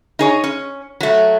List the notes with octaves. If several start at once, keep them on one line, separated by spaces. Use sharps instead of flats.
D#4 G#4 C#5
C#4
F#3 A3